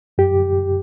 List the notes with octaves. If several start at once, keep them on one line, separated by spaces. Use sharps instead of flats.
F#2 G4